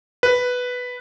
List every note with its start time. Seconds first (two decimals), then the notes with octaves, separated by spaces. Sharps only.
0.23 B4